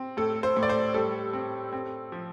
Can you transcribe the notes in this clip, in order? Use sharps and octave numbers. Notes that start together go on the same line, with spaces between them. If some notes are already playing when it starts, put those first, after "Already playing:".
Already playing: C4
A2 A4
C5
A2
D5
C5
G3 A4
C4
C4
F3